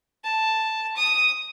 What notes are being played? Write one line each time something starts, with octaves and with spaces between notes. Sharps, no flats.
A5
D#6